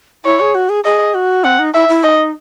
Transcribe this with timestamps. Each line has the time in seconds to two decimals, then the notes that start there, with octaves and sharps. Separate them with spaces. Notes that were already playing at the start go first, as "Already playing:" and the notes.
0.25 E4 C#5
0.40 G#4
0.55 F#4
0.69 G#4
0.84 G#4 D#5
1.14 F#4
1.44 C4 F#5
1.59 D#4
1.74 E4 E5
1.89 E4
2.04 D#4 D#5